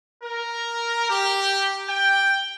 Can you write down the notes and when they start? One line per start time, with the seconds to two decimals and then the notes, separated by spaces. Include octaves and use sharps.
0.23 A#4
1.10 G4
1.89 G5